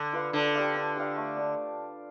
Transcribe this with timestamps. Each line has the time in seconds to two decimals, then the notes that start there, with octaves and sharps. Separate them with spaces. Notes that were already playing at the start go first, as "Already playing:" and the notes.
Already playing: D3
0.13 F4 B4 F5
0.33 D3 D4
0.55 G4 D5 F5
0.75 D4
0.95 G4 D5 F5
1.17 A3
1.37 D4 G4